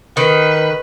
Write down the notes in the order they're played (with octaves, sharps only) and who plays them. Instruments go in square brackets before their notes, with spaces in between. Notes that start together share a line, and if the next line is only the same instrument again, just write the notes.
[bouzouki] D#3 [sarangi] B4